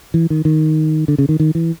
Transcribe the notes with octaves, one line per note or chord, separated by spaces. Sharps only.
E3
D#3
D#3
D3
C#3
D#3
D#3
E3